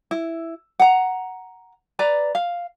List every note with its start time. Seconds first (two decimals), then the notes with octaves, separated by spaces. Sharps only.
0.11 E4
0.80 F#5 A#5
1.99 B4 D5 A#5
2.35 F5